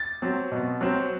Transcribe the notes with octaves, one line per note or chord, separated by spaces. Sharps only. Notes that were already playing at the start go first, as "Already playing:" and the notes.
Already playing: A6
F#3 C4
B2
F#3 C4